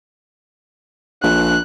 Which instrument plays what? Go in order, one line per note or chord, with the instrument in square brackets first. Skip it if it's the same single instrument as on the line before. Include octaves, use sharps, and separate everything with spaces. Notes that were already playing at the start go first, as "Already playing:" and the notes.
[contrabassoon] A#1 [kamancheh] F#6